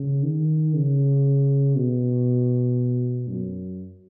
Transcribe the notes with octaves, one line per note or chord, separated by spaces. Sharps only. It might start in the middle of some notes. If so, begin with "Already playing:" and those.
Already playing: C#3
D#3
C#3
B2
F#2